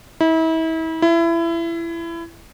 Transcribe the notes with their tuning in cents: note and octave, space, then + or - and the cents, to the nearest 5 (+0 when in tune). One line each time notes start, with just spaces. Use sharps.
E4 -35
E4 +25